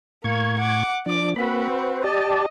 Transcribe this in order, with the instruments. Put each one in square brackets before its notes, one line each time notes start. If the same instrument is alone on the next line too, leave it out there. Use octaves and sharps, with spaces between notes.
[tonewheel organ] A2 C#6 G#6 [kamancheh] A#3
[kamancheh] F#5 D6
[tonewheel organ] F3 D4 [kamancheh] D5 D6
[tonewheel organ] A#3 B4 B5 [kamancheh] C4 F#4
[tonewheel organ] B4 C5
[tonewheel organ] G4 D5 A5 [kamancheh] D#5